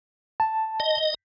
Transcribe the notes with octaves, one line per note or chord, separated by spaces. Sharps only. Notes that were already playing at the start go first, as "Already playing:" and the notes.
A5
D#5